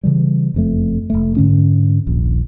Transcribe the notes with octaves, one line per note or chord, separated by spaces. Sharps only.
C#3 E3 G3
F#1 F2 A3
F1 C#2 A3
G#2 D3 C#4
D#1 A#1